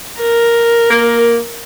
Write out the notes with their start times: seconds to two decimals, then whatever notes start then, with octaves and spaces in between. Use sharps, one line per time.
0.21 A#4
0.90 A#3